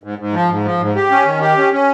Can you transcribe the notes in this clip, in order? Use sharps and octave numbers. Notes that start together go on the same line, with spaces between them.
G#2
G#2
F3
G#2
F3
G#2
G4
C#4
D#3
G4
C#4
C#4